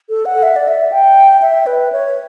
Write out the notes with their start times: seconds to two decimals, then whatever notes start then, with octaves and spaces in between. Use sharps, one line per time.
0.09 A4
0.26 F#5
0.43 E5
0.56 D5
0.68 E5
0.92 G5
1.42 E5
1.67 B4
1.92 C#5